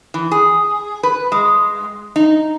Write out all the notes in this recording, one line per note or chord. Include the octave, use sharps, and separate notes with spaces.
E3
G#4
B4
G#3
D#4